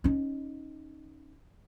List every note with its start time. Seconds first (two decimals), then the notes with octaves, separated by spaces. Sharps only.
0.04 C#4 D#4